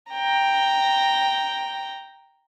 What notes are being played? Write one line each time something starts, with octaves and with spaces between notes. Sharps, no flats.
G5 A#5